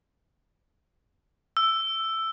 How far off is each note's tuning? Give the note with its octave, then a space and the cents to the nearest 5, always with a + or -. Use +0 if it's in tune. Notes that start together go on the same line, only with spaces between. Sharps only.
E6 +5